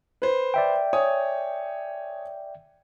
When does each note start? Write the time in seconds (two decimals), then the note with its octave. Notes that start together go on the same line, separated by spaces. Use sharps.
0.22 B4 C5
0.54 D5 E5 G5
0.93 C#5 G#5 D#6